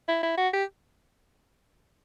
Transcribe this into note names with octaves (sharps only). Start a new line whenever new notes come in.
E4
E4
F#4
G4